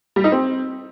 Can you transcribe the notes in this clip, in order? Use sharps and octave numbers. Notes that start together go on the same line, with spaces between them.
G3
D#4
C4